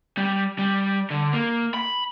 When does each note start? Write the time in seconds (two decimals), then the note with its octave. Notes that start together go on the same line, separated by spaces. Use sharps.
0.18 G3
0.59 G3
1.10 D3
1.33 A#3
1.74 B5